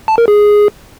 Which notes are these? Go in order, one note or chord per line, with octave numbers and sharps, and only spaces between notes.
A5
A#4
G#4